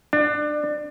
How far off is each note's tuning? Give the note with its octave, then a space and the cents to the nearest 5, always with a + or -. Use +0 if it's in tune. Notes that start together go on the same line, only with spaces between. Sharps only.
D4 +25